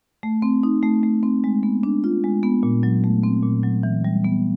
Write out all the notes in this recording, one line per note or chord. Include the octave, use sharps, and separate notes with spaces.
A3
C4
D#4
A3
A3
C4
G#3
B3
D4
F4
G#3
B3
A#2
F#3
A3
C4
A#2
F#3
E3
G3
B3